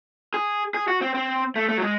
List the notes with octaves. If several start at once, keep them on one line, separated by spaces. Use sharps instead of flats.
G#4
G#4
F#4
C4
C4
A3
A3
F#3
G#3